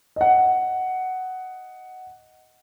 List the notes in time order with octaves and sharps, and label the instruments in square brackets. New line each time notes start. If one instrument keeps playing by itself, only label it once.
[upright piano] D#5 F#5